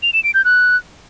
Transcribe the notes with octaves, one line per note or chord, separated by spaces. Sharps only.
F7
E7
D7
G6
F#6